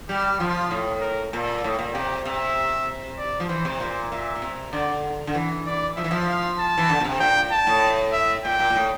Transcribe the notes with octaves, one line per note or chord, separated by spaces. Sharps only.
G3 G4
F3 F4
A2
A#4
A#2 A4
A2
A#2
C3 G4
C3 E5
D5
F3
E3 C5
C3
A#2 C5
A#2 E5
A#2
C3
D3 D5
D3
E3
D5
F3 E5
E3
F3
F5
A5
E3
D3
A#2
C3
A#2 G5
A5
A2
E5
A#2 G5
A#2
A#2
A2